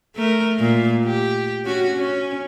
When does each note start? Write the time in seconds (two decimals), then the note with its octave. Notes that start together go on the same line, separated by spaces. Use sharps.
0.16 A3 A#4
0.59 A#2
1.05 G4
1.65 C#4 F#4
1.97 C#4